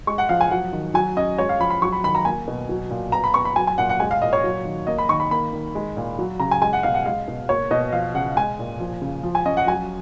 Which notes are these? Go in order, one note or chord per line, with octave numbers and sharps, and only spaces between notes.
G#3 C#6
F#5
F3 F5
G#5
F#3 F#5
D#3
F#3 G#5
C#4 D#5
G#3 C#5
F5
F3 B5
B5
F#3 C#6
B5
D#3 B5
A#5
A#3 G#5
B2
F#3
A#2
B3 A#5
B5
B3 C#6
B5
F#3 G#5
G#5
A#2 F#5
F#5
G#3 G#5
F5
A#2 D#5
C#5
F#3
D#3
A#3 D#5
B5
D#3 C#6
B5
A#3 B5
D#3
G#3
A#2
F#3
C#3 A#5
G#5
G#3 G#5
F#5
B2 F5
F#5
G#3 F5
B2
A#3 C#5
B2 D#5
F3 F5
C#3 F#5
G#3 G#5
A#2
F3
C#3
F3
G#5
C#4 D#5
F#5
F#3 G#5